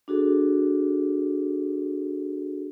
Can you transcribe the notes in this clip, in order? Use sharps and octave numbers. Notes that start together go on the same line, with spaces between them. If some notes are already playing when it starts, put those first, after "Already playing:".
D4 F#4 G#4 A4